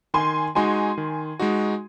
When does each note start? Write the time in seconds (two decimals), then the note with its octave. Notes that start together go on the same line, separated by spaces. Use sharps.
0.14 D#3 G#5 C6
0.55 G#3 D#4 F#4 G#5 C6
0.98 D#3
1.39 G#3 D#4 F#4